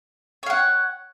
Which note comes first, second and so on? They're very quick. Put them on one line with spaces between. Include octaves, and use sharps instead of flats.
C#5 F5 F#5